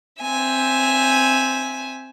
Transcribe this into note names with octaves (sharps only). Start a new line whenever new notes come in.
C4 E5 G#5